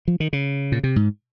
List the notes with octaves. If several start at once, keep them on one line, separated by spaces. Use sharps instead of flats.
F3
D#3
C#3
A#2
C3
G#2